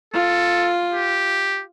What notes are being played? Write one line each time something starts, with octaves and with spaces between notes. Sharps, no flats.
F4 A4
G4